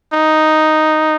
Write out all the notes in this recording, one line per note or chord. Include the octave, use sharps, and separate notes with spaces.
D#4